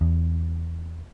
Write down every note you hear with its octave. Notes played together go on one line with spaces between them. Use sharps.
E2